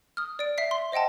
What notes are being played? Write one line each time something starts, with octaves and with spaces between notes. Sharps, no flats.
D#6 F6
D5 D7
E5 B6 C7
C6
C5 D#5 F#5 G5 A5